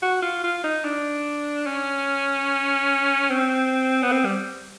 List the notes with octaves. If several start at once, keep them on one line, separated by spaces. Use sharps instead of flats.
F#4
F4
F4
D#4
D4
C#4
C4
B3
C4
G3